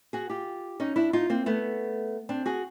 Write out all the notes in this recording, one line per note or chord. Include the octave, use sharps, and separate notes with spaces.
F#4 G#4
F4 G4
C#4 D#4
D4 E4
D#4 F4
A#3 C4
A3 B3
C4 D4
F#4 G#4